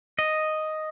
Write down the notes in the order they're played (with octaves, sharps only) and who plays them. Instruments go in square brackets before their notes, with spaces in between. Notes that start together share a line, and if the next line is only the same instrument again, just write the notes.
[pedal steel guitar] D#5